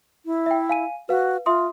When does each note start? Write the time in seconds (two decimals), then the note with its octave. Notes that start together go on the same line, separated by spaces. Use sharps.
0.26 E4
0.46 E5 G5
0.69 F5 G#5 D#7
1.09 F#4 B4 F5
1.46 F4 E5 C6 D#6